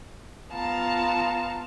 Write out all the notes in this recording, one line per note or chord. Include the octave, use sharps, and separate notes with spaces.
B3 F4 F5 A5 A#5